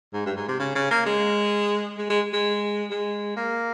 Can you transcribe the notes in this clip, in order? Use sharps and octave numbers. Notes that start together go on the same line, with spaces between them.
G#2
G2
G#2
C3
C#3
C#3
A#3
G#3
G#3
G#3
G#3
G#3
A#3